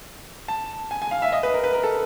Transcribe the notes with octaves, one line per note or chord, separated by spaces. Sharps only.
A5
G#5
G#5
F5
E5
D#5
B4
A#4
B4
A#4
A4